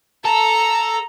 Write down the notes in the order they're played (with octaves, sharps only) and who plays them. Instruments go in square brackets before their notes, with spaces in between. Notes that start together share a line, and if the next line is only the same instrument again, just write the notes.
[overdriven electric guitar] A4 [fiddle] A#5